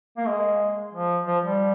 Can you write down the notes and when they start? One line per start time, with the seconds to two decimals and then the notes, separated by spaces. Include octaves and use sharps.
0.17 A#3
0.26 G#3
0.94 F3
1.26 F3
1.44 G3